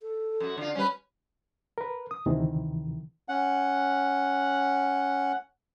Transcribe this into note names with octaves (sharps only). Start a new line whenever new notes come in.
A4
F#2 F#4
D3 F4
G3 C#4 B4
A#4 B4
D#6
D2 C3 D#3 E3
C#4 F#5